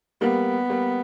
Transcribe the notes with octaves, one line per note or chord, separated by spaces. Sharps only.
G3 A#3 B3
G3 A#3